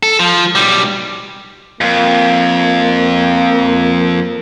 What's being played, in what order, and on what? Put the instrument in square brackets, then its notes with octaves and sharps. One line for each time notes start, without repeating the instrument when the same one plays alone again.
[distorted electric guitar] A4
F3
B1 G3
[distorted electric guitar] F2 [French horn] A#3